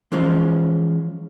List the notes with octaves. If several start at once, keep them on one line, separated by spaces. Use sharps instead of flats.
E3 F3 G#3 C#4 F4 C5